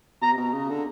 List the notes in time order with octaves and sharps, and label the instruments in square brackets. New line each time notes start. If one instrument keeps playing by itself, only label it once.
[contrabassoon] B2 [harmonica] A#5
[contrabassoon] C3
B2
C#3
D3